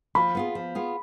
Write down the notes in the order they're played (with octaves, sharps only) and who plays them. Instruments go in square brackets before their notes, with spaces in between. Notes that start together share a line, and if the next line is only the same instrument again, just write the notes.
[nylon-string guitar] F3 [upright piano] B5
[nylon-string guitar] B3 F4 G#4
F3
B3 F4 G#4